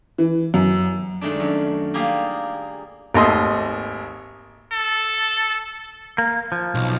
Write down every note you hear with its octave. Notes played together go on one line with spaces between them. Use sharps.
E3
F#2
D#3 G#3 A3 D4
F#2
G3 A#3 F4 G4 G#4
G#1 D#2 A3 D#5 C6
A4
A#3
F3
B1